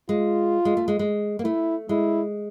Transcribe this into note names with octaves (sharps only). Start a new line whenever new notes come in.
G#3 F4
G#3
A3
G#3
G#3
A#3
A3 E4
G#3 E4